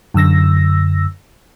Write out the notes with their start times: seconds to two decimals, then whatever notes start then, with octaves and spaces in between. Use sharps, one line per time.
0.14 F#2 D3 E6 A#6